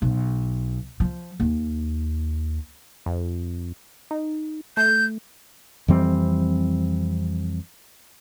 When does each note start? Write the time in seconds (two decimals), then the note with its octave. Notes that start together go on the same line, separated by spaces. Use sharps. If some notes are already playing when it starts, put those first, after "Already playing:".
0.02 B1
1.00 F3
1.40 D#2
3.06 F2
4.11 D#4
4.77 A3 G6
5.88 F2 E3 G3 C4